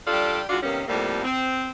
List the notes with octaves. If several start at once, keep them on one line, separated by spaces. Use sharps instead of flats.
G3 D4 F4 G4 A4 D5
D#3 G#3 D4 F4 F#4
C3 D#3 G3 A#3 B3 C#4
F2 A2 C3 G3 A#3
C4